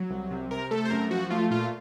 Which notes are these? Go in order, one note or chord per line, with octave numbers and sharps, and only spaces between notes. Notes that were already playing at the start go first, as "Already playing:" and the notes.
Already playing: F#3
C2
C3
C3 A#4
A3 A4
C5
F#2 A#4
F3 F#4
A3 F4
A#2 F4